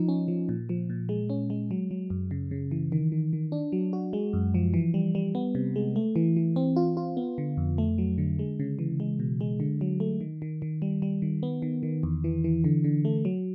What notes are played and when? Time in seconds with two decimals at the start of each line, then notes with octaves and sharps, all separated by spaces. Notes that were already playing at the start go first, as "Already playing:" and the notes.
Already playing: F3 D#4
0.09 C#4
0.28 F3
0.49 A#2
0.69 F3
0.90 A#2
1.09 G#3
1.30 C#4
1.50 G#3
1.71 F#3
1.91 F#3
2.10 F#2
2.31 C#3
2.51 C#3
2.71 E3
2.92 D#3
3.12 D#3
3.33 D#3
3.52 D4
3.72 F#3
3.93 F#4
4.13 G#3
4.33 F#2
4.54 F3
4.74 E3
4.94 G3
5.15 G3
5.35 B3
5.55 C3
5.76 G#3
5.96 A3
6.16 E3
6.36 E3
6.56 C4
6.76 F4
6.97 F4
7.17 B3
7.38 D3
7.57 F2
7.78 A3
7.98 F#3
8.18 D3
8.39 G#3
8.60 C#3
8.79 E3
9.00 G#3
9.19 B2
9.41 G#3
9.60 D3
9.81 F#3
10.00 A3
10.21 D#3
10.42 D#3
10.62 D#3
10.82 G3
11.02 G3
11.22 D#3
11.43 B3
11.62 D#3
11.83 D#3
12.03 E2
12.24 E3
12.44 E3
12.64 D3
12.84 D3
13.05 A3
13.25 F#3